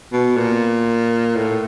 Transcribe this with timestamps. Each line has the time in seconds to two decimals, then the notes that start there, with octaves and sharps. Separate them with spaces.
0.13 B2
0.37 A#2
1.36 A2